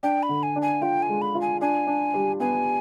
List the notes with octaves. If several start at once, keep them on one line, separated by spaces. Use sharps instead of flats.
D4 G5
B5
D3
G#5
D4
G#5
F4 G5
G#5
G#3
B5
F4
G#5
D4 G#5
D4
G3
B3 G#5